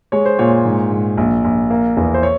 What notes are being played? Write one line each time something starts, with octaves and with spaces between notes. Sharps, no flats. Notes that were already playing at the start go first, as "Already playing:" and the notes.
G#3 C#5
C5
A#2 C#5
G#2
G#2
A#1
A#1
A#3
E2
C5
C#5